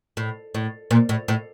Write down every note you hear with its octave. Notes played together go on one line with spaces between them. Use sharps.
A2
A2
A#2
A2
A2